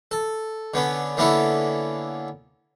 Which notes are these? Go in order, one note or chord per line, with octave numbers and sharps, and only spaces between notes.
A4
D3 B3 C#4
D3 A#3 B3 C#4 E4 A4